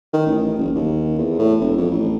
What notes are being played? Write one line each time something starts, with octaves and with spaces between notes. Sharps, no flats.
D#3
A1
F#1
D#2
E2
A2
E1
F2
A1